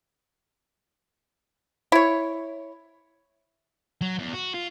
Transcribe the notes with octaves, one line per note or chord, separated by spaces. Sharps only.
E4 C#5
F#3
E2
F#4
F4